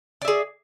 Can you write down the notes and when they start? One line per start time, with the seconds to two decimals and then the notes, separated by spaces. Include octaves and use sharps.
0.22 D5
0.25 E5
0.28 G#4